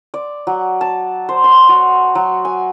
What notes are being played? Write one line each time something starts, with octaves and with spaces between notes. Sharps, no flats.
D5
F#3
A5
C5
C6
F#4
F#3
G#5